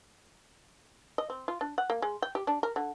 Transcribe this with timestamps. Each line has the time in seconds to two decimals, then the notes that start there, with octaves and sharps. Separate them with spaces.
1.18 D#5
1.30 C4
1.48 F4
1.61 D4
1.78 F#5
1.90 A#3
2.02 G#3
2.22 G5
2.35 G4
2.47 D4
2.63 A#4
2.76 D3